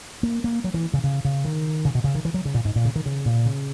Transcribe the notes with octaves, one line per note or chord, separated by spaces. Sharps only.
A#3
A#3
F#3
E3
C#3
C#3
C#3
D#3
C#3
B2
C#3
D#3
E3
F#3
C#3
A#2
G#2
A#2
C#3
D#3
C#3
A#2
C#3